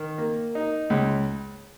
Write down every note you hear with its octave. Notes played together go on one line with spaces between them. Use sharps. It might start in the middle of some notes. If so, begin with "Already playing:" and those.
Already playing: D#3
A#3
D#4
C#2